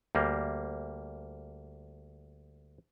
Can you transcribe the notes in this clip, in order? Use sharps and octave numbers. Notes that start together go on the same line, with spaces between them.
D2 G3 A#3